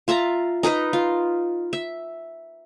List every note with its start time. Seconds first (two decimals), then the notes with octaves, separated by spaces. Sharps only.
0.08 F4 E5 A5 A#5
0.63 D#4 A#4 B4 D#5
0.93 F4
1.73 E5